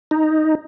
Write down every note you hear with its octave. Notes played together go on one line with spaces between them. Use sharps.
D#4